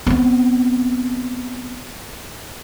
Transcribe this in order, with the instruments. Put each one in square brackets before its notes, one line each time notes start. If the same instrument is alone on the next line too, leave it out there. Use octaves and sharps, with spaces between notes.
[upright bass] B3 C4